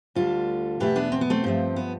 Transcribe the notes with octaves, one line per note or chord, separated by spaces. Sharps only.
D2 D3 G3 F4 A4
E2 B2 A3 G4 B4
B3 D4
C4
B3
A3 C4
G2 F3 A3
B3